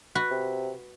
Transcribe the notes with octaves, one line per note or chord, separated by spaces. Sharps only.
F#4 B4
C3